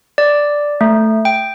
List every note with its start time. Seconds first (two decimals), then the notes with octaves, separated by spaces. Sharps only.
0.18 D5
0.81 A3
1.25 G5